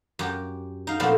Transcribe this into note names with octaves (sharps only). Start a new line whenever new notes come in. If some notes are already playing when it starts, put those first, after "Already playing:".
F#2 G4
D#4 F5
A#2 F3 A3 B3 C4 D4